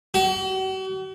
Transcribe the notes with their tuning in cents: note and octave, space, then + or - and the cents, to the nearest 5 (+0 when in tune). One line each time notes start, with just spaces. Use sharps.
F#4 +45